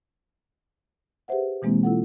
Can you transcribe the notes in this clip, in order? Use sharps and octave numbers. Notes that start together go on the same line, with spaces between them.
G4 G#4 B4 C5 E5 F#5
B2 E3 G#3 A#3 C4 E4
E4 F4 A4 F#5